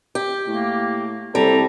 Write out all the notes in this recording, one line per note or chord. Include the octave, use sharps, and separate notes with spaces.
G4
A2 A#3
C2 G3 C4 A4 A#5